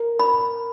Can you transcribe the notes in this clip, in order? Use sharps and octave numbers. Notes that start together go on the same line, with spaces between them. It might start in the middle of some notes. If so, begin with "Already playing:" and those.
Already playing: A#4
B5